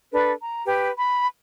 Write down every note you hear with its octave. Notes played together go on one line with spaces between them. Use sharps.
D4 A4 B4
A#5
G4 B4
B5